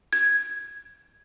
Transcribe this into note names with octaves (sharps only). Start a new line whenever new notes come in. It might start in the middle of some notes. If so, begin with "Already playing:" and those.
G#6